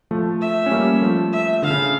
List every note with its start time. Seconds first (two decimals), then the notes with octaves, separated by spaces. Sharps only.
0.11 F3 A3
0.41 E5
0.66 C#4
0.71 G3 A#3
1.02 F3 A3
1.33 E5
1.62 D3 F5
1.70 C#3